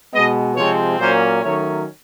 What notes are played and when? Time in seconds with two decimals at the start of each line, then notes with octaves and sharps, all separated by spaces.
0.14 B2 G#3 B3 D#5
0.57 C3 F3 G#3 C4 C#5
1.00 A#2 F#3 A#3 C#4 C5
1.43 D#3 F#3 A3 C#4 C#5